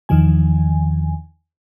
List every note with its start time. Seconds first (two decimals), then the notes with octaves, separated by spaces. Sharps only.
0.09 E2 D#3 F3 G#5